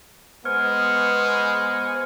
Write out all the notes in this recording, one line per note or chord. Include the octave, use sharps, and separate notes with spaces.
G#3 B3 C5 G#5 C#6 F6